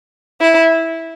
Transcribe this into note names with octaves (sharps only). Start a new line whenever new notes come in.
E4